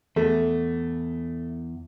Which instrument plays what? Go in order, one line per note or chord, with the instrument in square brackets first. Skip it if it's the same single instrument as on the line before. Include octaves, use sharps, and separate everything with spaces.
[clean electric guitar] E2 [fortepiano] A3